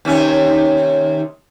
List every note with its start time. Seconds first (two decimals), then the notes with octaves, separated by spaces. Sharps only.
0.05 D#2 C3 C#4